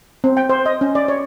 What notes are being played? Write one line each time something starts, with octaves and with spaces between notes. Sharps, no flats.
C4
G5
C5
D#5
C#4
D5
C#5